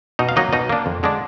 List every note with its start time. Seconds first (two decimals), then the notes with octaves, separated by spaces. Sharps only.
0.19 B2 D#4 D#5
0.29 F5
0.36 F#3 A#3 D#4 D#5
0.52 B2 D#4 D#5
0.69 A#3 D4
0.86 F2
1.03 D3 G#3 D4